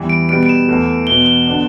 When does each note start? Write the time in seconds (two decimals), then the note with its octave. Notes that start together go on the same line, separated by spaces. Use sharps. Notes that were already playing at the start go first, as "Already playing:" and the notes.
Already playing: E2 E3 G3
0.09 D7
0.29 B2 G3 B3 D7
0.43 D7
0.49 E7
0.68 E2 E3 A3
1.07 E2 B2 B3 G7
1.26 G7
1.47 D3 B3 D4